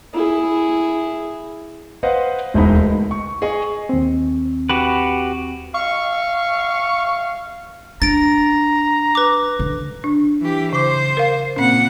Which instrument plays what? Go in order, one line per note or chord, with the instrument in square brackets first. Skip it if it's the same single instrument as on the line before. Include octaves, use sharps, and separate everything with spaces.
[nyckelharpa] E4 G#4
[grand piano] B4 C5 D#5 F5 F#5
E1 D2 G#3 D#4 B5
C#2
C#6
G#4 D#5 C#6
[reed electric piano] D#2 C4
[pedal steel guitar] F#4 G4 B4
[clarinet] F5 [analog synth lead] C#6
[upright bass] D4 [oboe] A#5 [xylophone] A6 D7
[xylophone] B4 D6
[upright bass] D3
[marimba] D4
[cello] E3 G4
[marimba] C#3 D6 [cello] C5
[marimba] A#4 F5
[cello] A#2 F#5 [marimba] C4 C#4